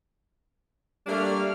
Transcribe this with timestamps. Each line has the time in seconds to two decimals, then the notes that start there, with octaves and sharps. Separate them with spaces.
1.07 G3 A3 A#3 D4 F6